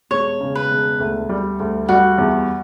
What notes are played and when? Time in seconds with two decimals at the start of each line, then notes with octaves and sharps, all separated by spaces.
0.11 E1 C#5
0.41 C#3
0.55 B4
0.71 E1
1.00 D2
1.29 G3
1.60 D2
1.89 G3 F#4
2.18 E2